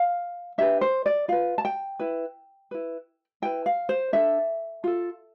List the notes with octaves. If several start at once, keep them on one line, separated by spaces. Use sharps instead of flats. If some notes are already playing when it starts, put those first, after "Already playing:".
Already playing: F5
D4 G4 B4 E5
C5
D5
F4 B4 F5
A5
G5
E4 B4
E4 B4
E4 B4 G5
F5
C5
D4 A4 E5
F4 A4